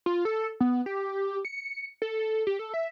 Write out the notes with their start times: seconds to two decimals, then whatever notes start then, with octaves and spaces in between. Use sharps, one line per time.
0.06 F4
0.25 A4
0.60 B3
0.86 G4
1.45 C#7
2.02 A4
2.47 G4
2.59 A4
2.74 E5